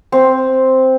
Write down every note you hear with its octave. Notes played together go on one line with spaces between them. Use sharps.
C4